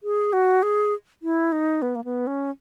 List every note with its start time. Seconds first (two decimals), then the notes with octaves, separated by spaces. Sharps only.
0.03 G#4
0.33 F#4
0.63 G#4
1.22 E4
1.52 D#4
1.82 B3
1.95 A#3
2.04 B3
2.27 C#4